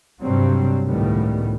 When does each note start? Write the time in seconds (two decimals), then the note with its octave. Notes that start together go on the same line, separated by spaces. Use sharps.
0.22 G2 C3 F#3 G3 C4
0.86 C#2 A2 D#3 G3 B3